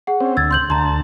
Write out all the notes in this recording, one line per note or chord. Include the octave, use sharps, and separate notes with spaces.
G#4 F#5
C4 C#4
D2 E6 G#6 A6
C6 G6 F#7
D2 A5 A#5 C6